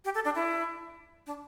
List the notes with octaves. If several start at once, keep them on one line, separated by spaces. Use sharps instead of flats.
G4
A4
D4
E4
D4